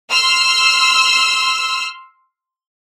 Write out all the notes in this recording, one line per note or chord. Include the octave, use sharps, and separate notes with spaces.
C6 E6 F6